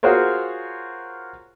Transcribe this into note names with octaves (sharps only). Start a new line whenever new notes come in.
F4 F#4 G#4 A#4 C5 C#5